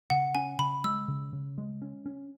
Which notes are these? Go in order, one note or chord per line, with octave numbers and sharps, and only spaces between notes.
C#3 F#5
C#4 G#5
C#3 B5
G#3 E6
C#3
C#3
G#3
C#4
C#4